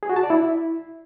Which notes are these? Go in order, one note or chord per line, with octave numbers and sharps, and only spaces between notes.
G#4
F#4
A5
D5
E4